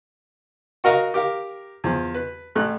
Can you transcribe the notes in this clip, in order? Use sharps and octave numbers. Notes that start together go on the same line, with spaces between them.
F#4 A#4 D#5 F5
G4 A#4 F5
E2 F3
B4
A1 A3 F#6